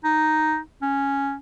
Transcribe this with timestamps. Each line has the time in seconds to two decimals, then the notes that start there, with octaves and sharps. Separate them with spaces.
0.04 D#4
0.82 C#4